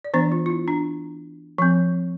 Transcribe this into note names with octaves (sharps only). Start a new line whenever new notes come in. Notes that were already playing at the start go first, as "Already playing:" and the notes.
D5
E3 B3 D4 C5
F4
F4
E4
D4
F3 C4